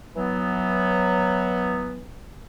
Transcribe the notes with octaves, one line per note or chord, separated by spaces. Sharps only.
E3 F#3 B3